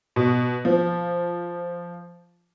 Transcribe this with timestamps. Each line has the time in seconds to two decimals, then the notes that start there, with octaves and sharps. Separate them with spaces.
0.16 B2
0.65 F3